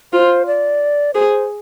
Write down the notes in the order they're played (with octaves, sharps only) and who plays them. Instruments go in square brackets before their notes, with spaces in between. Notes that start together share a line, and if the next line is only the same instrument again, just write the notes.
[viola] F4 [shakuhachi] C5
[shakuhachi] D5
[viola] G#4 [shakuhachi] C5